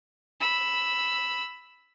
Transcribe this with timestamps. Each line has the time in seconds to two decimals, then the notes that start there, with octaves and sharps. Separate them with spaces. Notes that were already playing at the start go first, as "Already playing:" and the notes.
0.40 B5 E6